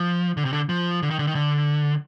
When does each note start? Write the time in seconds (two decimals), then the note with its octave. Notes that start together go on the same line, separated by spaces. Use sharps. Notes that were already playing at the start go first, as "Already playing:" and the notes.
Already playing: F3
0.37 D3
0.45 C3
0.53 D3
0.69 F3
1.02 D3
1.10 D#3
1.19 D3
1.27 D#3
1.35 D3